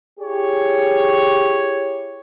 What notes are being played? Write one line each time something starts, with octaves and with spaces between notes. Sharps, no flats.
E4 G4 G#4 C#5